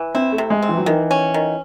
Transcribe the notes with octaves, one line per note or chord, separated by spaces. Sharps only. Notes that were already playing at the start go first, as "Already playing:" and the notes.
Already playing: E3
C4 E4
A3
C3
G#3
C4
E3
F#3
D#3 E3
C#4
D#3